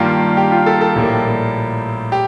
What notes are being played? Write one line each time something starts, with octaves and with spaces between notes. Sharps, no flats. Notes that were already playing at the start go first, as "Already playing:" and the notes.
Already playing: G2 D#3 G3 A#3 F4
G4
F4
A4
A4
A#1 A2 G3 A#3
G4